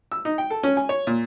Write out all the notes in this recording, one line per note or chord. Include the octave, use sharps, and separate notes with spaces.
E6
D#4
G5
A4
C#4
G#5
C#5
A#2